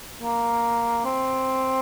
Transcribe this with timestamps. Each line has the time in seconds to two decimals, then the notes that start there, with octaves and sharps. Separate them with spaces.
0.22 A#3
1.05 C4